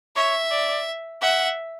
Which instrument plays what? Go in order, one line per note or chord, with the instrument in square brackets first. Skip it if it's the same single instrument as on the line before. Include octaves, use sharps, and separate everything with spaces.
[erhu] C#5 [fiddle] E5
[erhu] D5
[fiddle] E5 [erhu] F#5